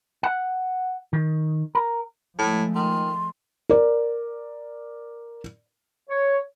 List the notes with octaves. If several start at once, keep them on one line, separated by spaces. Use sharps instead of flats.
F#5
D#3
A#4
A2 F3 G#3 A3
D#3 C6
A#4 D5
C#5